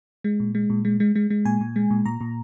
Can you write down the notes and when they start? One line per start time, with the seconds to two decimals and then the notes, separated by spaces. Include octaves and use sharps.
0.24 G#3
0.40 A#2
0.55 G#3
0.70 A#2
0.85 G#3
1.00 G#3
1.15 G#3
1.30 G#3
1.45 A#2 G#5
1.61 A#2
1.76 G#3
1.90 A#2
2.06 A#2 A#5
2.21 A#2